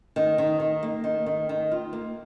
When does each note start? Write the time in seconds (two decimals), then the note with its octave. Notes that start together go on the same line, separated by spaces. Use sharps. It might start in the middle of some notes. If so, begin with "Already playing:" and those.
0.16 D#3
0.38 D#3
0.60 D#3
0.83 A#3
1.04 D#3
1.26 D#3
1.49 D#3
1.71 F4
1.93 A#3